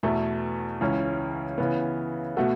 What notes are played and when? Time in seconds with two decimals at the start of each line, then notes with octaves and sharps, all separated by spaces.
0.03 E2 B2 A3
0.81 C#2 C#3 E3 C#4
1.58 C#3 E3 B3
2.37 B2 A3 F#4 A4